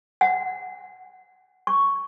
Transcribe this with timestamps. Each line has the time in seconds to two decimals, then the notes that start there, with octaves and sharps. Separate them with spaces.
0.21 F#5
1.67 C#6